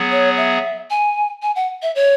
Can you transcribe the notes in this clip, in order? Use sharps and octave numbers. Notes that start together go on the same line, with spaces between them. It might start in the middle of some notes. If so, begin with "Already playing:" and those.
Already playing: F#3 B3 G#4
C#5
E5
G#5
G#5
F#5
E5
C#5